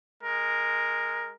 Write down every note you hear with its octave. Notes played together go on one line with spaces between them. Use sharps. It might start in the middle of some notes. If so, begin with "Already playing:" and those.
G#3 A#4